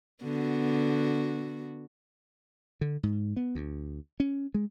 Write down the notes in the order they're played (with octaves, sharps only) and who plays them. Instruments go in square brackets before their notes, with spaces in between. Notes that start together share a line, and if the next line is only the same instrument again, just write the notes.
[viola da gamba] D3 B3 F#4
[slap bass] D3
G#2
B3
D2
C#4
G#3